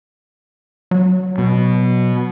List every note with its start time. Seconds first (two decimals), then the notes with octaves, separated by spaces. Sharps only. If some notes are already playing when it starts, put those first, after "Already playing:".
0.91 F#3
1.38 B2